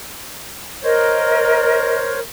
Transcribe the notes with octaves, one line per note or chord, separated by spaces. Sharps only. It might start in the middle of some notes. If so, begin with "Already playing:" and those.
A#4 C5 C#5 D#5